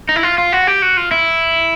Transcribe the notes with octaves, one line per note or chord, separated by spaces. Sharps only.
D#4
E4
F4
F4
F#4
G4
F#4
F4
E4